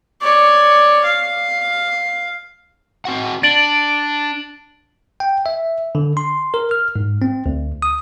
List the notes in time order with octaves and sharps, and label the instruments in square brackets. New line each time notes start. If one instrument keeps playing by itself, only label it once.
[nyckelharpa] C#5 D5
F5
[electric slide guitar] C4 F#4 F#5
[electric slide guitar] D4 [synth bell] A6 D7 F#7
[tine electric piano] G5
E5
D3
C6
A#4
F6
G#2
C4
D2
D#6